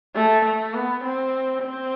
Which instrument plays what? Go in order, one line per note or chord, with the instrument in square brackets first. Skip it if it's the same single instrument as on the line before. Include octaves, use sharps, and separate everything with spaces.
[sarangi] A3
A3
B3
C4
C4